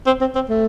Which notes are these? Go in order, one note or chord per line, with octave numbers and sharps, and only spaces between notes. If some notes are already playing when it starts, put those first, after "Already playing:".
C4
C4
C4
A3